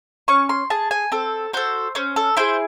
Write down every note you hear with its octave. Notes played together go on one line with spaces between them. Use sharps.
C#4 C#6
C6
G#4 A5
G#5
C4 A4
F#4 A4 C5
C#4 C5
A4
E4 G#4 C5